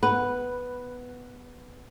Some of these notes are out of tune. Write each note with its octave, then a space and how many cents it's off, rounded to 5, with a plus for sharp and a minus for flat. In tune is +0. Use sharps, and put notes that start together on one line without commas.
B3 +0 B4 +0